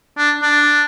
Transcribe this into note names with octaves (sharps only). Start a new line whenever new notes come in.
D4
D4